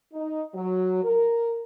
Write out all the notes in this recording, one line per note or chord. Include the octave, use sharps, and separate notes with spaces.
D#4
F#3
A#4